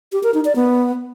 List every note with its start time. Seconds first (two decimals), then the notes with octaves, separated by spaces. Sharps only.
0.12 G4
0.23 A#4
0.34 D#4
0.45 D5
0.56 B3